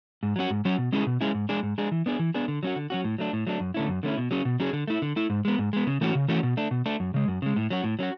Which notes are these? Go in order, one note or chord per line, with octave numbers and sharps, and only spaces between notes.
G#2
F#3 C#4 F#4
G#2
F#3 C#4 F#4
B2
G#3 C#4 E4 G#4
B2
G#3 C#4 E4 G#4
G#2
G#3 D4 G#4
G#2
G#3 D4 G#4
E3
B3 D4 G#4
E3
B3 D4 G#4
D3
F#3 C#4 F#4
D3
F#3 C#4 F#4
A2
F#3 A3 D4
A2
F#3 A3 D4
F#2
D3 A3 C#4 E4
F#2
D3 A3 C#4 E4
B2
F#3 C#4 G#4
B2
F#3 C#4 G#4
D3
A3 E4
D3
A3 E4
G#2
G#3 B3
G#2
G#3 B3
C#3
E3 A3 C#4 F#4
C#3
E3 A3 C#4 F#4
B2
A3 D4
B2
A3 D4
F#2
C#3 G#3
F#2
C#3 G#3
A2
F#3 C#4 F#4
A2
F#3 C#4 F#4